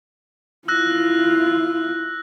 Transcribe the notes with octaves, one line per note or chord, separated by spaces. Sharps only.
E4 F4 E6 F#6 A#6